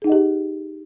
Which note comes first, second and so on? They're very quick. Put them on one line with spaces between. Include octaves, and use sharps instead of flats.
G#4 D#4 F#5 D#5 G4